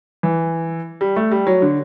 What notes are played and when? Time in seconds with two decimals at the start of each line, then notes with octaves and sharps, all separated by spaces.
0.23 E3
1.01 G3
1.16 A3
1.32 G3
1.47 F#3
1.62 D3